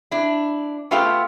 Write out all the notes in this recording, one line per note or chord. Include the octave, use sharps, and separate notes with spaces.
D4 E4
A3 B3 F4 G4 A4 F5